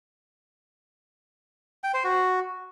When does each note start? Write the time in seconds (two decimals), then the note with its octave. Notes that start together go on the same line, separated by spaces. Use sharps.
1.84 G5
1.94 C5
2.04 F#4